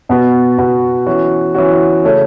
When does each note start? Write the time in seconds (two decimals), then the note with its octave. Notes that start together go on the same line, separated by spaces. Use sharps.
0.09 B2 B3 F#4
0.58 B2 B3 F#4
1.06 E3 C#4 F#4
1.55 E3 C#4 F#4
2.03 C#3 A3 C#4